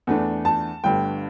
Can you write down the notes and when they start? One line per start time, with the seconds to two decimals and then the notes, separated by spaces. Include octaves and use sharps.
0.07 E2 E3 A3 D4
0.45 A5
0.84 G1 G2 D3 A3 G5